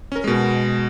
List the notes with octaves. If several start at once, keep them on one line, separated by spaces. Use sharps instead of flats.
C#4 A#4
B2 G#3